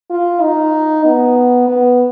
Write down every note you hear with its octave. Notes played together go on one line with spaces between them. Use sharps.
F4
D#4
B3
B3